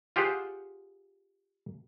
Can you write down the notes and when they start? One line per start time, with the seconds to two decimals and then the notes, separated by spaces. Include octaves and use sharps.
0.16 F4 G4 G#4 C5 F#5